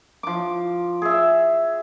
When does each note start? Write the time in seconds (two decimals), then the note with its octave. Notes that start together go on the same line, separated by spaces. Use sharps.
0.23 F3 D6
1.02 G#4 E5